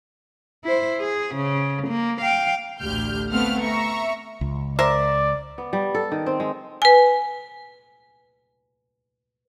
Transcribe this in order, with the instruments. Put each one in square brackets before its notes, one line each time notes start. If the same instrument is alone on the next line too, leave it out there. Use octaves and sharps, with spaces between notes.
[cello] E4 C5
G#4
C#3
A#3
F5 G5
[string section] A1 D2 G4 F6 G6
A3 B3 C4 F5 F#5 F6
E5 A#5 C#6
[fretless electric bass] C#2
[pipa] A#4 C5 E5 [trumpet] D5
[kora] B3
G3
A4
D#3
C4
G#3
[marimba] B4 G#5